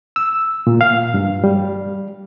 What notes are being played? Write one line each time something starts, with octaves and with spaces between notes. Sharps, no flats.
E6
A#2
F5
G2
G3